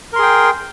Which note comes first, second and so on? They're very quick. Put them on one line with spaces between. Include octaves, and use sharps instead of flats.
A#4 C6 G#4 G5